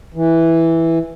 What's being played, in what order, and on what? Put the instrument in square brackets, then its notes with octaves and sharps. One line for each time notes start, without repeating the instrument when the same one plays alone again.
[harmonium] E3